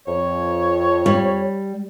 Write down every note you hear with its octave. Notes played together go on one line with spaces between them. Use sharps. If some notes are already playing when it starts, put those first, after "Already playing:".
F2 C#5
G3